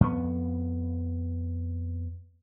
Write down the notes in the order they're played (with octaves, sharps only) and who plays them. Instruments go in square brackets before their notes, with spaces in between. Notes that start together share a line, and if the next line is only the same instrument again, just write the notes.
[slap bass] F2 B3